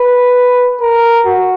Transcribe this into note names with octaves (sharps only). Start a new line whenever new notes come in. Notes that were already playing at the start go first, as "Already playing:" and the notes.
Already playing: B4
A#4
F#4